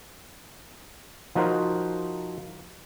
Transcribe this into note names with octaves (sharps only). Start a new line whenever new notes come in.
F3 D#4 F#4 A#4 C5